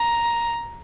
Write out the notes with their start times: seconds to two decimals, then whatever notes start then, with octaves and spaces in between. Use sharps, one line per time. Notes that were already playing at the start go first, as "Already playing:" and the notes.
Already playing: A#5